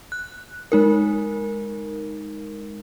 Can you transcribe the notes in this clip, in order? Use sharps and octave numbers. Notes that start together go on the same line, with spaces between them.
F#6
G#3 D#4 A#4